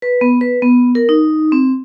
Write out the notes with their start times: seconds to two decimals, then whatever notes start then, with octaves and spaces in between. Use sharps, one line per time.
0.02 B4
0.21 B3
0.41 B4
0.62 B3
0.95 A#4
1.09 D#4
1.52 C4